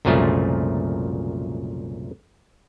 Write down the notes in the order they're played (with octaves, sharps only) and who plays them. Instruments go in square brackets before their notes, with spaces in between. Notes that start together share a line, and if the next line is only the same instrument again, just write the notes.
[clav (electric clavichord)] C2 F#2 A#2 C#3 F3 A3